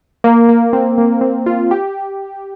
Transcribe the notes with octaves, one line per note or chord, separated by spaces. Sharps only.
A#3
A#3
C4
A#3
A#3
C4
F4
G4